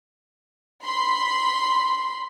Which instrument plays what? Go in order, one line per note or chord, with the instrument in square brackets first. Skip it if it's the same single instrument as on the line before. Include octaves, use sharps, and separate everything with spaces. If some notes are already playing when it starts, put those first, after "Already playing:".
[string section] B5 C6